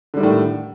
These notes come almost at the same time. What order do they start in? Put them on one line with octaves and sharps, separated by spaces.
D3 G3 D#3 A2